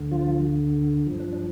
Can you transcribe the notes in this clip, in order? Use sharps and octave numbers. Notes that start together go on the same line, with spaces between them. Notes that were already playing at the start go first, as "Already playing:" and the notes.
Already playing: D2 D3
F3 F4
G2 F3
D4
D4